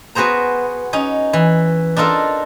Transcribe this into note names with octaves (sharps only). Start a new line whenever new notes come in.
B3 F#4 G#4 C5 A#5
C#4 D#4
E3
D4 D#4 F4 A4 A#4